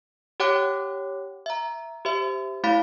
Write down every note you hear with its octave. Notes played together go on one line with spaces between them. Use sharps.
G4 C#5 F#5 G5 D6 F#6
E5 A#5
G4 C5 E5
A3 E4 F5 B5 B6